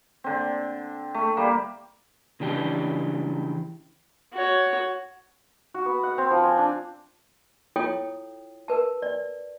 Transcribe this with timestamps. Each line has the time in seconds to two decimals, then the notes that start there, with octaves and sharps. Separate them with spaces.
0.24 D3 C4
1.14 A3
1.37 G3 A#3
2.40 C#3 E3 D4 G4
4.33 F#4 C#5
5.74 F#4
5.86 B3
6.03 F#5
6.18 C4
6.31 F3
6.44 G#5
6.58 D4
7.76 E4 F4 A4 C#5 G5 D#6
8.68 A#4 B4 A5
9.02 D5